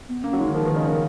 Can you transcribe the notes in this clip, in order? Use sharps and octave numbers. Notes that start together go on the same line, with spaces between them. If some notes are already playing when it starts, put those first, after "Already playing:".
B3
A#3 C#4
F#3
G#3 D#4
D#3
F3 A#4
D#3 B4
C#3 D#5
C#3 A#4